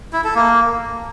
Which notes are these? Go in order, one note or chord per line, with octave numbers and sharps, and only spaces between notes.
E4
A4
A#3